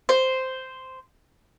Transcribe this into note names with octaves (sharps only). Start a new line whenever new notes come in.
C5